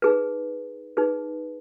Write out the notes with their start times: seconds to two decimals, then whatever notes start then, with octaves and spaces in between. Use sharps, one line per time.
0.02 D#4 G#4 B4
0.97 D#4 G#4 B4